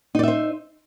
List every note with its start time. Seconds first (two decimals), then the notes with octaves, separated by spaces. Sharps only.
0.15 D#4
0.19 D5
0.23 E5
0.28 C5